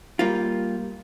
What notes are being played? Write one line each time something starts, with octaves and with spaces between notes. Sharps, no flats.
G3 A#3 F4